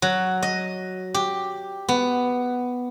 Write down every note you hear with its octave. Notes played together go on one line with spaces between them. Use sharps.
F#3
D#5
G4
B3